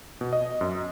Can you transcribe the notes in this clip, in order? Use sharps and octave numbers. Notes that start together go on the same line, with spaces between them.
B2
D#5
F#2